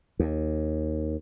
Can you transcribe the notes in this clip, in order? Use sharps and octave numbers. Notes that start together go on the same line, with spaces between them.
D#2